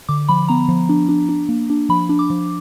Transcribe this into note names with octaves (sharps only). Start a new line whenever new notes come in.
D3 D6
F3 B5
B3 A#5
F3
D4
D4
D4
A#3
D4
F3 B5
D4
D6
F3